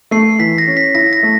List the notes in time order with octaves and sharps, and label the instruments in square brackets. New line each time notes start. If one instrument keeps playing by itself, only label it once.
[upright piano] A3 [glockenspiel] C7
[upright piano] E3 [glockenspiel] B6
[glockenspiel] A#6
[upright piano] C#4
[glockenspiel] B6
[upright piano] E4 [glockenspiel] A#6
[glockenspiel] A#6
[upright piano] A3